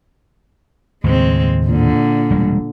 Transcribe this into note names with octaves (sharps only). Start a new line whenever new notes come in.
D#2 A2 C#3 G#3 C4
A#2 D3
E1 G3 G#3